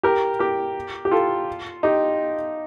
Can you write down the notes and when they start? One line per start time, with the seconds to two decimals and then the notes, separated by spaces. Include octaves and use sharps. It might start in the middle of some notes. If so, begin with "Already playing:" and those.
0.03 G4 A#4
0.39 G4 A#4
1.05 G4
1.11 F4 A4
1.83 D#4 G4